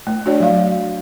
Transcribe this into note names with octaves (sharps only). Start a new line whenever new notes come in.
A3
D4 F#4 C#5 D5
F#3 F5